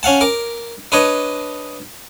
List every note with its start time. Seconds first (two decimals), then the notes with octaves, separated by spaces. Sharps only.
0.03 C#4 F5 F#5 A5
0.21 A#4 D6
0.92 D4 B4 C#5 D#5